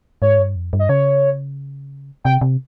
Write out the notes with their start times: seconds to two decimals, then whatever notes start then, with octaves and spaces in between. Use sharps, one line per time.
0.22 G#2 C#5
0.39 G2
0.56 F2
0.73 G2
0.79 D#5
0.89 C#3 C#5
2.24 C3 G5
2.41 C3